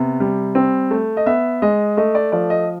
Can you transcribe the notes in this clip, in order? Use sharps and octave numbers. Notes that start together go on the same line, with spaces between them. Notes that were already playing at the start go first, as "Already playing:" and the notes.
Already playing: C3 B3
G3
C4
A3
D#5
B3 E5
G#3 D#5
A3 D#5
D5
F3 D5
D#5